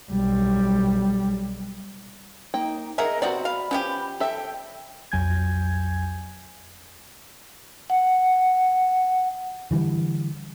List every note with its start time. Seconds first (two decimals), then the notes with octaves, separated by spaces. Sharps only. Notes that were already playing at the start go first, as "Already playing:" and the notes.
0.12 B1 G3
2.54 A#3 D#4 G5
2.98 G#4 A#4 D#5 E5 F#5
3.22 C3 B3 C4 F#4 D5 F#5
3.45 F5 B5
3.71 F3 B3 C#4 G4
4.20 A4 E5 G5
5.12 B1 F2 F#3 G#5 G6 G#6
7.90 F#5
9.71 D3 E3 G3